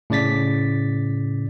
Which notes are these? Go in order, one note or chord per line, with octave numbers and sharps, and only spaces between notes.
A2 C#3 D5 A6 B6